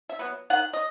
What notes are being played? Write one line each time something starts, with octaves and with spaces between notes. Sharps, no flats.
E5
F#3 B3
D#3 F#5
D#5